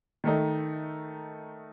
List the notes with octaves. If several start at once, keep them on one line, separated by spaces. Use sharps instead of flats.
D#3 A3 D#4